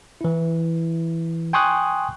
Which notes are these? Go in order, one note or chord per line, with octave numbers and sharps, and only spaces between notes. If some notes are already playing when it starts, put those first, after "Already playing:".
E3 E4
G5 G#5 C6 C#6 D#6 F#6